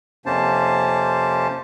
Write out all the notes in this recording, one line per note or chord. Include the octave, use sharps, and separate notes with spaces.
F2 C3 A#3 C#4 C5 A5